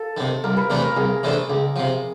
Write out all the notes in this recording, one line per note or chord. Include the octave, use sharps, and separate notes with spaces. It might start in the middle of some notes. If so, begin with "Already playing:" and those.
Already playing: A4
C3 D#3
C2 A#4
B4
C3 E3 A3 D4 A#4
A#4
C2 G#4
C3 E3 A3 D4
C#2
C3 F3